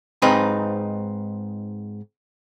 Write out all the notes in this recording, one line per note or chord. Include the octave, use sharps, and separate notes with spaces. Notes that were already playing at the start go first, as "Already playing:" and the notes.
G#2 C4 D#4 B4